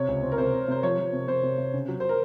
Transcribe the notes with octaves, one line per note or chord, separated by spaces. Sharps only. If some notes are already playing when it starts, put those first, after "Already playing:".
Already playing: C3 C#5
C#2
C4
A#4
C3 C5
C3
C3 C5
F3 C#5
F3
C3
C3 C5
C3
C3
C#3
F#3
C5
A#4